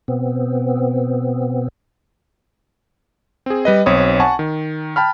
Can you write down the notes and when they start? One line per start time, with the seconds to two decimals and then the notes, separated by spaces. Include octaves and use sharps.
0.08 B2 B3 C4
3.46 C4 G#4
3.65 G3 B4 D#5
3.86 B1 C4 C#5 D#6
4.20 F#5 G#5 A5 C#6
4.39 D#3
4.96 G5 A5 B5 F6